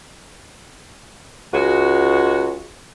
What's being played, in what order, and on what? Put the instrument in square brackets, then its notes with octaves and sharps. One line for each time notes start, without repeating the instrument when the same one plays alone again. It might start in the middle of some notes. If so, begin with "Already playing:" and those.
[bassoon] C#2 [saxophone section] G#3 F#4